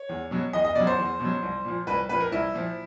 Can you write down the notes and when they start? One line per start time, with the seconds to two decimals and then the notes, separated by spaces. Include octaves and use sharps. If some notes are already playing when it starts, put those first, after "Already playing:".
Already playing: C#5
0.09 E2
0.31 B2 F#3
0.53 E2 D#5
0.65 D#5
0.75 B2 F#3 D5
0.87 C5
0.98 E2
1.20 B2
1.25 F#3
1.42 C2
1.65 A#2 F3
1.87 C2 B4
2.09 A#2 F3 B4
2.20 A#4
2.32 C2 E4
2.54 A#2 F3